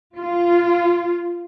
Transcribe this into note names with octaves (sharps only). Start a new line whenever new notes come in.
F4